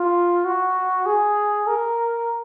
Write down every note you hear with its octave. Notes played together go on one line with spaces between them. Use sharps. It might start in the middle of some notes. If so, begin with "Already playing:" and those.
Already playing: F4
F#4
G#4
A#4